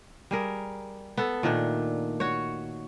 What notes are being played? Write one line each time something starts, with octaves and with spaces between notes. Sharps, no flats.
G3 G#4 A#4
B3 A4
A#2 D#3 A3 D4
F#4 C#5